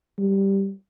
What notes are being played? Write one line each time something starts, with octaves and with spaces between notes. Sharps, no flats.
G3